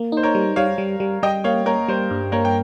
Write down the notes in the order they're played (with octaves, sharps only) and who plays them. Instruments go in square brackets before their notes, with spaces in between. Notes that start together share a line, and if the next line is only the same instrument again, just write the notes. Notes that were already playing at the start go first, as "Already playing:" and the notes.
Already playing: [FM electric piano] A#3
[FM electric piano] D#4 [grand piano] C5
[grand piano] A#4 C#5
[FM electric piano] G3
[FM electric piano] G3 [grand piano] C#5 F5
[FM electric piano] G3
G3
[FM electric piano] G3 [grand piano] D#5 G5
[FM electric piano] A#3 [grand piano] C#5 F5
[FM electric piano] A#3 [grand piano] A#4 C#5
[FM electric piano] G3 [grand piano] C5
[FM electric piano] G2
[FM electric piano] A#3 [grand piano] A#4 C#5
[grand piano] G5